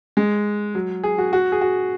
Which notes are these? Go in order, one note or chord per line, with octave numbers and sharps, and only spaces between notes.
G#3
F#3
G#4
F#4
F#4
G#4
F#4